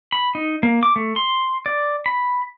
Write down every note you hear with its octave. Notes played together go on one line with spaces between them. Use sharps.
B5
D#4
A#3
D6
A3
C6
D5
B5